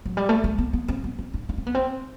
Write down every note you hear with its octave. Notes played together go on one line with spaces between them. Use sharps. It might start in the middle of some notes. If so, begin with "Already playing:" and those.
F#3
G3
A3
A3
B3
B3
C4
B3
C4
D4
D4
C4
B3
C4